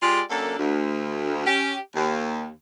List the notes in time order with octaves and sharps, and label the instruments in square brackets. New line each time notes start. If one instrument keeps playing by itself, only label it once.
[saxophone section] G#3 F4 G4 G#4 D5
F#2 A#3 D4 A4
D2
C#4 G4
D#2